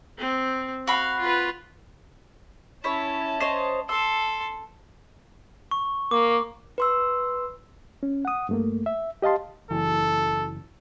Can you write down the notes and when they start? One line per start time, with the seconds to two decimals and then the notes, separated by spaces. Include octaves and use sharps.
0.18 C4
0.87 F#4 F5 B5
1.20 F4 B4
2.84 C#4 E4 C#5 A5
3.40 C5 C#5 D#5
3.89 A4 C6 E6
5.71 C#6
6.11 A#3 D6
6.78 B4 C6 E6
8.03 C#4
8.25 F#5 D#6
8.49 G2 A3 A#3
8.86 E5
9.22 G4 D#5 F5 A5 C6
9.71 F#1 E3 A4